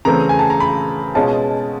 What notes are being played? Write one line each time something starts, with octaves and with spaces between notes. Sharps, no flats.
C#3 E3 A3 C4 A#5
G#5
A5
A#5
B5
B2 G#3 C#4 F4 A5